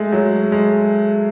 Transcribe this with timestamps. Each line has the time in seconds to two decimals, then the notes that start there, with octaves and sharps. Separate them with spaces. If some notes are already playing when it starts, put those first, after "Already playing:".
Already playing: G#3 A3
0.13 F#3
0.52 G#3